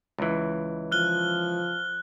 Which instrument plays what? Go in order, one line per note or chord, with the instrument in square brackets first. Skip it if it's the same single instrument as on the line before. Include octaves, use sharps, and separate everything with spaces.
[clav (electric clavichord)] C#2 E3
[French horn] F3 [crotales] F6 F#6 G7